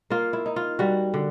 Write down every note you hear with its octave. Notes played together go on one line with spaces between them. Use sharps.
A#3 F4
E4
D#4
F4
G3 F#4
D3